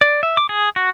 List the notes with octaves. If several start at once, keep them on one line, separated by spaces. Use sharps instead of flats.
D5
E5
D6
G#4
F#4